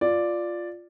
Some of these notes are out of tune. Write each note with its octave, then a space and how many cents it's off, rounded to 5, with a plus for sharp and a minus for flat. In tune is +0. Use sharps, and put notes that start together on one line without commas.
F4 +0 D5 +0